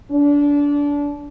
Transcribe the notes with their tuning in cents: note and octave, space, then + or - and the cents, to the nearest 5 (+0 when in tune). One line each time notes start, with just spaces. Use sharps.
D4 -25